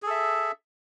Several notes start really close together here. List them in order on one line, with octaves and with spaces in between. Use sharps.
G#4 A4 E5